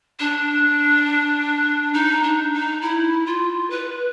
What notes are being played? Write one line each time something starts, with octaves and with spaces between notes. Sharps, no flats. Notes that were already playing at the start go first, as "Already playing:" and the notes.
D4
D#4
D4
D#4
E4
F4
B4